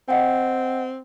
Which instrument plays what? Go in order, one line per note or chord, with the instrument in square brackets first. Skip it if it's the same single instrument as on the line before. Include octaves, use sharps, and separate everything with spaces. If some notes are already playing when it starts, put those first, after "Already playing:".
[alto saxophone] C4 [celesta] D#5 F#5 G5